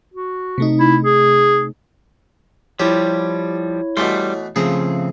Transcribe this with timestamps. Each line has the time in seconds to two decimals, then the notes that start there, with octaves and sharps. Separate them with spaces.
0.14 F#4
0.58 C3 A3 D#4
0.79 E4
1.04 G#4
2.79 F3 G3 E4 G4 C#5
3.97 B2 E3 G3 A3 C6
4.56 C#3 F3 A3 C4 G#4